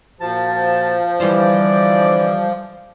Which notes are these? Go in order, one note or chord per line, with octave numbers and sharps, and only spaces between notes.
A#2 F3 F#4 A5
D3 E3 G3 F4 C5 D5